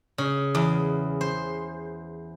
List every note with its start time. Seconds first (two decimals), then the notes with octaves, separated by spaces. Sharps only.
0.18 C#3
0.55 E2
1.21 C5